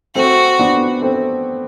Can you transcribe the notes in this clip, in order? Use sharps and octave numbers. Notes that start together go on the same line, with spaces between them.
A3 C4 F#4
B3 D4
A3 C4